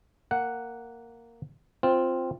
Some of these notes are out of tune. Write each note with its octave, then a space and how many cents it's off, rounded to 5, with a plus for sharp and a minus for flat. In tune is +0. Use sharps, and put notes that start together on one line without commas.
A#3 -10 F#5 +0
C4 +0 F4 +0